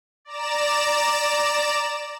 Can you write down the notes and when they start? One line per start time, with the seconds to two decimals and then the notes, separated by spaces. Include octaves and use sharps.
0.25 D5 A#5 E7